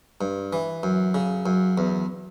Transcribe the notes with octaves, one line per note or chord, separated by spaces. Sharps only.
G2
E3
F#2
C#3
F#2
E2